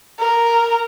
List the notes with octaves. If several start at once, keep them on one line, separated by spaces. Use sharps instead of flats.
A#4